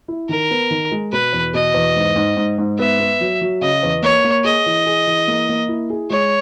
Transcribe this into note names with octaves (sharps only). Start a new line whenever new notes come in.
E4
D#3 A#4
B3
D#3
G#3
B2 B4
E2
B2 D#5
E2
G#2
G#2
G#2
G#2
B3 E5
B3
F#3
F#3
C#3 D#5
E2
A#3 C#5
A#3
G#4 D#5
E3
G#4
E3
A#3
A#3
E4
G#4
G#3 C#5